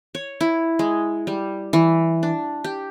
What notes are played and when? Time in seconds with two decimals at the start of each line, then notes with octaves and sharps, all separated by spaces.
0.15 C#5
0.41 E4
0.79 G#3
1.27 G3
1.73 E3
2.23 D4
2.64 G4